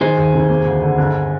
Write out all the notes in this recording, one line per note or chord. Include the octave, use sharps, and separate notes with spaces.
D#3 G#4 C5
D#2
F1
A#3
D2
D3
G1